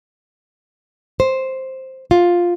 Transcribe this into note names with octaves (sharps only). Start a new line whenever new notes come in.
C5
F4